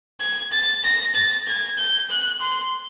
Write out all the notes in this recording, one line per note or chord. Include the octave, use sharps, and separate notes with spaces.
G#6
A6
A#6
A6
G#6
G6
F#6
C6